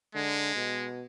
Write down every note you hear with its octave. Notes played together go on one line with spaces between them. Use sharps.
D3 G#3
B2